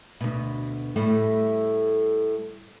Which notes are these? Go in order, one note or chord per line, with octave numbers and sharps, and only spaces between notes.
D2 B2
A2 G3 A3